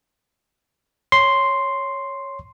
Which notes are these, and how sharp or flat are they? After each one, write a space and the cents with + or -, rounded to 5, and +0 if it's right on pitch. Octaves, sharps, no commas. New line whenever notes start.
C#5 +0 C6 +0